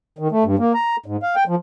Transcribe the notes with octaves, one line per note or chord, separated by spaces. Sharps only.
D#3
A3
G2
A#3
A#5
G#2
F5
G5
F3